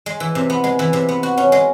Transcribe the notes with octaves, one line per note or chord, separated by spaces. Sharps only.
G#3
E3
C3
B3
G#3
E3
C3
B3
F#4
C#4
G#3